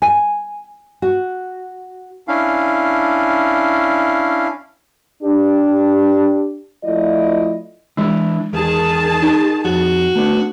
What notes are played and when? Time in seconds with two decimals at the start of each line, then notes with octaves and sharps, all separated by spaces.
0.02 G#5
1.02 F#4
2.28 C#4 D4 E4 F5
5.23 D4 G4
6.83 F3 A3 E4 F4 D5 D#5
7.97 E3 G#3 D4 E4
8.53 E2 D#3 G#4 A5
9.22 D#4
9.65 F2 F#4
10.16 A3 B3 D4